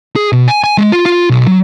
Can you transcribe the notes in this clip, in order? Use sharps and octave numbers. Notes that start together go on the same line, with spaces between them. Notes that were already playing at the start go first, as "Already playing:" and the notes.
G#4
B2
G#5
G#5
G#3
F4
F4
B1
F#3